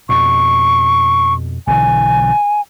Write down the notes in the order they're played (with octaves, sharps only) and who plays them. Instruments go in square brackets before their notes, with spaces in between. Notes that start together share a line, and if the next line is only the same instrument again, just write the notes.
[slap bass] F2 B2 [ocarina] C#6
[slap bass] B1 D3 E3 [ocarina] G#5